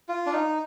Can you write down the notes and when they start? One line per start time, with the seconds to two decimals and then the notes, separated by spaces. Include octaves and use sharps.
0.09 F4
0.26 D4
0.33 D#4